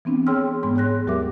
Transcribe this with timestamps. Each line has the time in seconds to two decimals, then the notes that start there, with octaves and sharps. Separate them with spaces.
0.05 E3 B3 C4 D4
0.27 G#4 C#5 G5 C6 E6 F6
0.63 G#2 G#3 B3 C6
0.76 G#4 C#5 F#6 A#6
1.07 D#2 F#3 G4 A#4 E5 D6